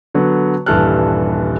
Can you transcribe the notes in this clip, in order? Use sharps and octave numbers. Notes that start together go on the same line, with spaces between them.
D3 F#3 B3
D#1 G2 E3 A4 F6 F#6